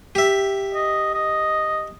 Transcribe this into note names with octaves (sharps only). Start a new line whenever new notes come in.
G4 E5
D#5
D#5